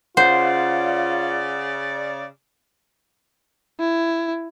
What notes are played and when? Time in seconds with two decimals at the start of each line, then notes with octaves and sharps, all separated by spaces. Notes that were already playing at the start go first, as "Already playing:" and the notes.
0.17 C#3 F4 C5 D5 F#5
3.80 E4